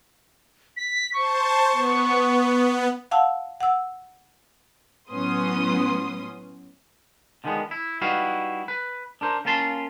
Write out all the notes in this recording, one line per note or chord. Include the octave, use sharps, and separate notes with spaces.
B6
C5 A5 C#6
B3
F5 F#5 A5 E6
F#5 E6
A2 F#3 B3 C#4 C6 D#6
D3 D#3 F3 G#3 B3
E4
G3 D#4 E4 F#4 B4 F5
B4
D4 A#4 C5
A#3 C#4 F4 A5 C6